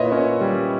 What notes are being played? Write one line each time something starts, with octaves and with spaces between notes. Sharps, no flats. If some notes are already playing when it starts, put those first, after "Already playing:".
Already playing: A#2 E4 B4 C#5 D#5 E5
C#4
G3